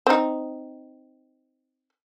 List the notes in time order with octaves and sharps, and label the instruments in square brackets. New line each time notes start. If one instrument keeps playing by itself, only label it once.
[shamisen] C4 D#4